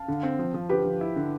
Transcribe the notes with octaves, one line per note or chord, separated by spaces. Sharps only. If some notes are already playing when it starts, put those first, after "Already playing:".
Already playing: F5 A5
D3
C4
F3
F3
D3 G4 B4
F3
E4
D3